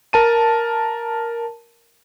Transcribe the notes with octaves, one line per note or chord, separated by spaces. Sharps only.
A#4 A5 D#7